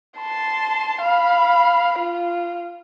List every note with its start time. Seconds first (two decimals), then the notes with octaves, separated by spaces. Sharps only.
0.20 A5 C6
1.02 F5 B5
1.99 F4